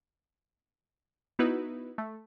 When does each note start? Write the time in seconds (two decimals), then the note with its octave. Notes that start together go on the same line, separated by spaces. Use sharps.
1.39 B3 D#4 E4 F#4 B4
1.98 A3